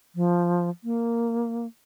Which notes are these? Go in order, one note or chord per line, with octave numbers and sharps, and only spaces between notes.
F3
A#3